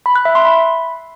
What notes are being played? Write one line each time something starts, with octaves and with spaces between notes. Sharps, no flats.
B5
F#6
E5
C6
B5